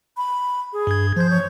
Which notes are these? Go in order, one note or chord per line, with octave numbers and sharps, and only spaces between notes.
B5
G#4
G2 G#6
F3 C5 G6
C#5